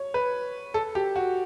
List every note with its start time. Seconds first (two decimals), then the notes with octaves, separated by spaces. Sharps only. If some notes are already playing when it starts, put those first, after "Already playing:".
Already playing: C#5
0.14 B4
0.74 A4
0.95 G4
1.16 F#4